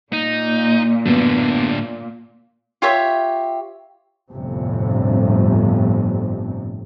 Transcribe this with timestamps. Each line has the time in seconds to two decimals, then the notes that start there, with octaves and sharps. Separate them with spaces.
0.13 A#2 D#4
1.05 F#2 A2 D3 B3
2.82 F4 G4 C#5 E5
4.32 G1 F2 A2 C3